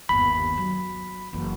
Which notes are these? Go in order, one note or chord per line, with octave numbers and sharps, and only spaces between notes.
G1 D#2 B5
F#3
F#1 E3